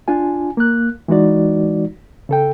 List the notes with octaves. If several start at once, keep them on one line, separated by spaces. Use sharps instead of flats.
D4 F4 G#5
A#3 F#6
E3 G#3 D#4 F#4 D5
C#3 A4 G5